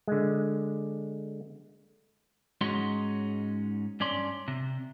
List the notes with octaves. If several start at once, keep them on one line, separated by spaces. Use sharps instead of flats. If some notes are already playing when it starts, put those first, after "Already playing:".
D3 G#3
G#2 G#3 C#4 D#4 F#4 C6
G2 C#4 D5 C6
C3